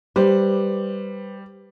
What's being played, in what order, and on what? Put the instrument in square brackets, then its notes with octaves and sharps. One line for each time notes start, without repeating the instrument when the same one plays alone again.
[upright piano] G3 [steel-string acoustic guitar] G4 B4 C5